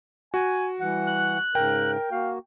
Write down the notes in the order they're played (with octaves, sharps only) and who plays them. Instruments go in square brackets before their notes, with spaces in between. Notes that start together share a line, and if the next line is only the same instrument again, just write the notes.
[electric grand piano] F#4 [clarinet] G#5
[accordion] E3 F#5 [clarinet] G3
[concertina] F#6
[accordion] G#2 C#3 [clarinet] A#4 [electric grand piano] G5
[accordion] A#3 F#4 [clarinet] F5